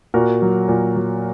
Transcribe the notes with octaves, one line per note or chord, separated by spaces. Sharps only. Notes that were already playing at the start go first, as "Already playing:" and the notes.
A#2 F#4 A#4
F#3
A#2
F#3